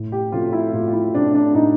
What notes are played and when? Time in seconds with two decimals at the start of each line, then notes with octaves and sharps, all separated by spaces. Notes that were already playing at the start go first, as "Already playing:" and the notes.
Already playing: A2
0.12 G4
0.32 F#3 A3 C4 F4
0.53 E4
0.73 A2 F4
0.87 F4
0.93 E4
1.14 F#3 A3 C4 D4
1.35 D4
1.54 A2 D#4